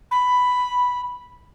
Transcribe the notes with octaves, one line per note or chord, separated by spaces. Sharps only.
B5